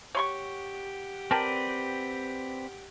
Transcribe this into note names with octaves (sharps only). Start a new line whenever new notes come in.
G4 C#5 F#5 C6 C#6
C4 A#4 B4 D5 G5 A5